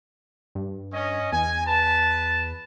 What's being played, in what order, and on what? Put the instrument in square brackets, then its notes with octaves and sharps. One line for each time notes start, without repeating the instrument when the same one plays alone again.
[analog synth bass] G2
[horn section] C#4 D#5
[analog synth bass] E2 [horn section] G#5
[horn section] B4 A5